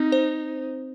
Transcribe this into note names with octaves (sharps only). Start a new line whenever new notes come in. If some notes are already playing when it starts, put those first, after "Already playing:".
Already playing: C4 D#4
C5